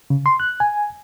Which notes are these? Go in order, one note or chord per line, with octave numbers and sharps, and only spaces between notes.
C#3
C6
F#6
G#5